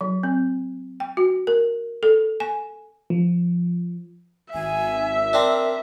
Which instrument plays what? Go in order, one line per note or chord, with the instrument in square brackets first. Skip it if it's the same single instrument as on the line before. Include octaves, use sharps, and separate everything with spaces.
[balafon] F#3
C4
G5
F#4
A#4
A4
G#5
[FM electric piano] F3
[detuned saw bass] G#1 [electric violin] E5 [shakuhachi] G#5
[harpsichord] C4 D4 [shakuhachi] A#4